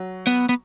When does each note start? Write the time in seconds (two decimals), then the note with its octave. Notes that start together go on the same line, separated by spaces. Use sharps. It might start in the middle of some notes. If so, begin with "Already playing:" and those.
Already playing: F#3
0.27 B3
0.49 B3